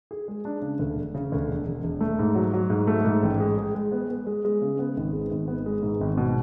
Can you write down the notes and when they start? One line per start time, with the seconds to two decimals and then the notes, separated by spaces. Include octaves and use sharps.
0.11 G#4
0.28 G#3
0.45 D4
0.62 C#3
0.79 D2
0.96 E1
1.15 C#3
1.32 D2
1.48 E1
1.66 E1
1.84 E1
2.00 A3
2.19 G#2
2.35 F#3
2.53 F#3
2.70 G#2
2.87 A3
3.05 G#2
3.23 A1
3.40 G#3
3.58 G#3
3.75 G#3
3.92 B3
4.09 B3
4.27 G#3
4.45 G#3
4.62 C#3
4.79 B3
4.97 G#1
5.13 G#3
5.31 G#1
5.48 B3
5.66 G#3
5.83 G#2
6.01 G#1
6.17 B2